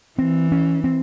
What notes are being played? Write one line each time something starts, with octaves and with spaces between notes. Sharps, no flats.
E3 C4
C#4
C4